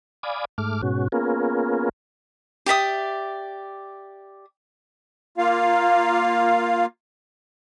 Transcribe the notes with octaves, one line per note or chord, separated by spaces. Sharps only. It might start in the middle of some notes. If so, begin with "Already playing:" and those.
D5 F5 G#5 B5 D6 D#6
G#2 A3 D6 F6
G#2 B2 C#4 F#4
A#3 B3 C#4 F4 G#4 A#4
G4 D5 E5 D#6
A#3 F4 F5